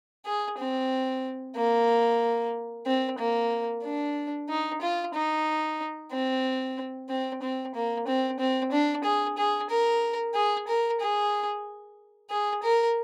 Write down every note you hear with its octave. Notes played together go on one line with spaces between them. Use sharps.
G#4
C4
A#3
C4
A#3
D4
D#4
F4
D#4
C4
C4
C4
A#3
C4
C4
D4
G#4
G#4
A#4
G#4
A#4
G#4
G#4
A#4